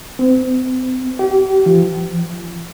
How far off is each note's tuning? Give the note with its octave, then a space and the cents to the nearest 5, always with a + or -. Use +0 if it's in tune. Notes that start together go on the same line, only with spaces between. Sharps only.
C4 -35
G4 -35
F3 -40